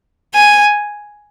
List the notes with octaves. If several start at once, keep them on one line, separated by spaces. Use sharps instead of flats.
G#5